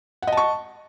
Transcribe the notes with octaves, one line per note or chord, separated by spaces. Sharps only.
D#5 F#5 A5 C#6